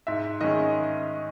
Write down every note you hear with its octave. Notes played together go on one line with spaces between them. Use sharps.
G#2 E5
D#3 G#3 C#4 D#5